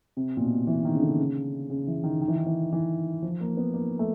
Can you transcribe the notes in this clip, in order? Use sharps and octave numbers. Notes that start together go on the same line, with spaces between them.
C3
A#2
B2
E3
D#3
C#3
D3
C#3
C#3
E3
D#3
D#3
E3
D#3
E3
E3
F3
A#3
B3
A#3
A3